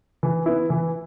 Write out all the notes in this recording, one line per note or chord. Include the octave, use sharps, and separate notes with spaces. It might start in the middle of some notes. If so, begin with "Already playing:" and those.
E3
B3 E4
E3